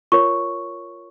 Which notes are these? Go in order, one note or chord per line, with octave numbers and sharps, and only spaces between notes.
F4 A#4 C#5 C#6